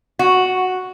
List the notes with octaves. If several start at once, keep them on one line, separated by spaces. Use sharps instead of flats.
F#4